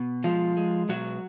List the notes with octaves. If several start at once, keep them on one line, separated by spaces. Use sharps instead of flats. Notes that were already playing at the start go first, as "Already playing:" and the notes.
Already playing: B2
F3 G#3 F4
G#3
B2 F#3 F#4